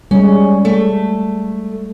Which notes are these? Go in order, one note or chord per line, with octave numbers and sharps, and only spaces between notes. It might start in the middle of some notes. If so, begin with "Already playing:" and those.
G3 G#3 C#4
A3